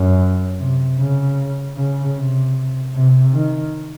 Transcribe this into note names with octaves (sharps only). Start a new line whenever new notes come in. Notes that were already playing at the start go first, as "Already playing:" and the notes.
Already playing: F#2
C3
C#3
C#3
C3
C3
D#3